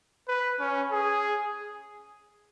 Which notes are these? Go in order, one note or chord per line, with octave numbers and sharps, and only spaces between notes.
B4
C#4
G#4